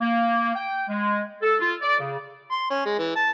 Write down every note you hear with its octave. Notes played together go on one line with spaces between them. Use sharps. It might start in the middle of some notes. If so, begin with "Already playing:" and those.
A#3
G5
G#3
A4
F4
D5
C#3
C6
C#4
G#3
E3
A5